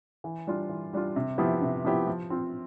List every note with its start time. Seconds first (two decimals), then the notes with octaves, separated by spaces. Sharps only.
0.24 E3
0.47 G3 D4 F4
0.69 E3
0.93 G3 D4 F4
1.16 C3
1.38 F3 B3 E4 G4
1.62 C3
1.85 F3 B3 E4 G4
2.07 F3
2.30 C4 F4